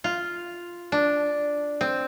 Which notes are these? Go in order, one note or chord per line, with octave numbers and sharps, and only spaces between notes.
F4
D4
C4